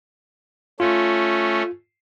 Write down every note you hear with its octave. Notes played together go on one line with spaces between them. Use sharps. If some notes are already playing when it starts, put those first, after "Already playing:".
A3 C#4 F4